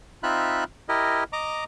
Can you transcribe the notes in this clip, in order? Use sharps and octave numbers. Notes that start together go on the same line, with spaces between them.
C4 D#4 F4 E5 B5 F#6
E4 G4 A#4 D#5
D#5 A#5 D6